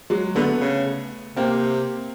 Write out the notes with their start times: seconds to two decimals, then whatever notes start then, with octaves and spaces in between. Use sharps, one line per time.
0.10 F#3 G#3
0.35 D3 A3 B3
0.60 C#3
1.36 C3 A#3 C4